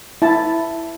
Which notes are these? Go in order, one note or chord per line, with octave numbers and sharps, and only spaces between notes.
E4 A5